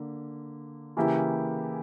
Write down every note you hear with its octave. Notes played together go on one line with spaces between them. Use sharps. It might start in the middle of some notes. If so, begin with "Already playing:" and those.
Already playing: D3 A#3
C#3 E3 A#3 E4 G4